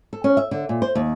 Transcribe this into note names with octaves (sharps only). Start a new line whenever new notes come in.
A4
C#4
E5
D3
A#2
C5
D#2